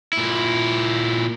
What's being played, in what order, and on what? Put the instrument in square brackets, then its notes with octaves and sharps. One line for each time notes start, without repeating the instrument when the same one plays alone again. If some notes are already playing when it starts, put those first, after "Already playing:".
[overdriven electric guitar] A#2 E4